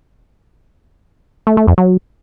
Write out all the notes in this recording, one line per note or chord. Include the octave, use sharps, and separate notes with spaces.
A3
A3
F2
F#3